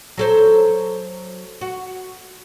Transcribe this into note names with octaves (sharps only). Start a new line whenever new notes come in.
F#3 A4 C5
F#4